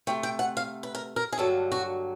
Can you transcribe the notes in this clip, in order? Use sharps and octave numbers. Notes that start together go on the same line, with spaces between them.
C3 F3 A3 G5
G5
F#5
F5
B4
A#4
A#4
G#4
G2 D3 F#3 A#3 A4
F#4